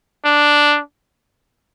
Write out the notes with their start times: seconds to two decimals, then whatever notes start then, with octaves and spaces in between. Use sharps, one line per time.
0.25 D4